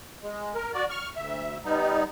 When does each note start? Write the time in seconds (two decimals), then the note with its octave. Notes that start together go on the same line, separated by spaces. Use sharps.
0.22 G#3
0.55 A#4
0.74 F#4 D5
0.90 C#6 F6
1.16 D2 E5
1.64 G3 B3 D#4